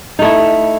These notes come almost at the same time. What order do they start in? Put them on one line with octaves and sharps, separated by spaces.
D#4 A3 E4